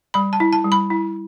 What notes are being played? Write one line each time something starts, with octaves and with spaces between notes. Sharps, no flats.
G3 B5
A5
E4
A5
G3
B5
E4